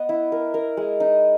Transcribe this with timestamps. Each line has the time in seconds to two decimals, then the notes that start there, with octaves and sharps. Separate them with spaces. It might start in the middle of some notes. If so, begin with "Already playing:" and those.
Already playing: B3 D#5
0.09 E4
0.32 A#4
0.54 A#4
0.77 G#3
1.00 D#4